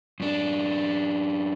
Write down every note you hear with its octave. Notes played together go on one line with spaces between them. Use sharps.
F#2 D4